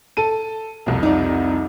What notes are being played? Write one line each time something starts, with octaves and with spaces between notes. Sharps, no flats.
A4 A5 D#7
C2 F2
D#4 D5